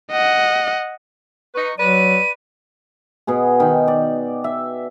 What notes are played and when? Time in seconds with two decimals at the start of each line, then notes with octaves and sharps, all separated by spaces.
0.11 D#5 F#5
1.55 D#4 B4 C#6
1.78 F#3 B4 D5 D#7
3.27 B2 F#4 G#4
3.60 D#3 G5
3.88 D5
4.44 E5